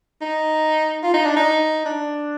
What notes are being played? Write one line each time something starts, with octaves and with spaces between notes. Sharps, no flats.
D#4
F4
D#4
D4
D#4
D4